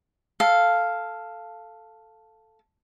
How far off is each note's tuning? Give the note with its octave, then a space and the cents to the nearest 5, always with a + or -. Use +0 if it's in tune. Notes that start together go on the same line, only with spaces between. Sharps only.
A4 +0 F5 +0